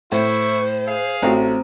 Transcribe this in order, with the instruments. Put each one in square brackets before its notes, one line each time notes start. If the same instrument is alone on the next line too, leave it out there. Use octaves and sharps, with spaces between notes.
[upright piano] A2 [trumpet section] E4 C#6 [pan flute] C5
[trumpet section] G#4 F5
[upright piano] A1 A3 F#4 [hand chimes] C4 C5 A#5